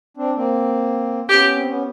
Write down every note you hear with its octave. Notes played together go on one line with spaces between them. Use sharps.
C4 D4
A#3 C4
B3 C#4 G4
C4
B3 C#4